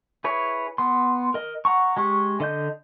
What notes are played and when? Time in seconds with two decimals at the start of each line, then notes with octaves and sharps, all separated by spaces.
0.24 E4 G#4 B4 C#5
0.78 B3 C6
1.34 A#4 D#5
1.65 F#5 A#5 C#6
1.97 G#3 G4 C#6
2.40 D3 D#5 G6